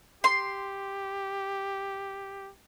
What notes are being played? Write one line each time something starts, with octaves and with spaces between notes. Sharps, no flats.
G4 C6